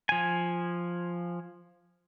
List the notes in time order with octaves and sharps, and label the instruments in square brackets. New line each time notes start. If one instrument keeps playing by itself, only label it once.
[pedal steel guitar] F3 G#5